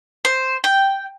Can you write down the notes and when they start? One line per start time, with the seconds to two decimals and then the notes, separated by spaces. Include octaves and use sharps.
0.25 C5
0.64 G5